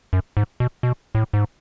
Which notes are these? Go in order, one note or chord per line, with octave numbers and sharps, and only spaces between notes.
F#2
G#2
B2
B2
A2
G#2